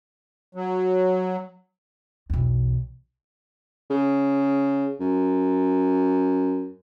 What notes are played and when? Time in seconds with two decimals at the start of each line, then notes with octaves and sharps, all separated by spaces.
0.55 F#3
2.30 B1 E2
3.90 C#3
5.00 F#2